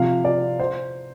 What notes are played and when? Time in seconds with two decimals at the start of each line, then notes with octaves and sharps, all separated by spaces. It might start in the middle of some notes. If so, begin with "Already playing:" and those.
Already playing: C3 F3 F5
0.25 D5
0.60 C5